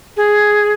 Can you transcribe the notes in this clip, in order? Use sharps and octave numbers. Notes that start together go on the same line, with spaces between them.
G#4